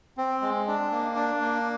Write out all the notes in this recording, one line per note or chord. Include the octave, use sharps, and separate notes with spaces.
C4
G#3
D4
A#3
D4
A#3